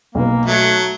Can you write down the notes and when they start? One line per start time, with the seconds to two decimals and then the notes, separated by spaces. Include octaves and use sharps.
0.15 B1 A#3 B4
0.46 F#3 A3